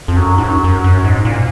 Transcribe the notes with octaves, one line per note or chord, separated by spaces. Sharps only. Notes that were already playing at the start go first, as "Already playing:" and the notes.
F2
F#2
G#2
F#2
F#2
F#2
G#2
A#2